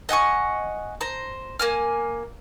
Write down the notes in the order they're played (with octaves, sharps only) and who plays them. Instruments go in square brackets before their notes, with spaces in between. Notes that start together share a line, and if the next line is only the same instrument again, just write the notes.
[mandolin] D#5 F#5 G#5 C#6
C5 A#5
A#3 G#5 F6